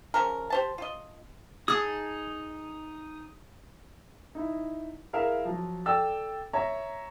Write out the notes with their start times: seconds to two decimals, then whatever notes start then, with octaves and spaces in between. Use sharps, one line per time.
0.14 C#3 F3 A#4
0.50 G4 C5 A5
0.78 F4 D#5
1.68 D#4 G#4 A5 D#6
4.35 D#4 E4
5.13 E4 G#4 A#4 E5 F5 A#5
5.45 F3 F#3
5.86 A4 D5 G5 E6 A6
6.53 C#5 E5 A#5